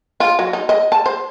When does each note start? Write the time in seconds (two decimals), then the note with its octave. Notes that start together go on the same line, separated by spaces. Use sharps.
0.20 F4
0.39 F#3
0.53 D#4
0.69 D#5
0.92 A5
1.06 C5